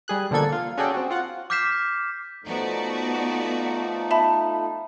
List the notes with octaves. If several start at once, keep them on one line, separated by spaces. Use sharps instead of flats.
G3 G#4 F#6
B2 D3 F3 A#3 A4 G#6
F4
C#4 F#4 G#4 A4 D5 G5
C4 F#4
F4 F#5
D6 F6 G6 B6 C7 E7
F3 A3 B3 D#4 F#4 D5
E5 A5 B5